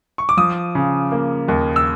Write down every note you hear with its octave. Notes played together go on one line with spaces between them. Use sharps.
C#6
D6
F3 D#6
C#3
A#3
D#2
E6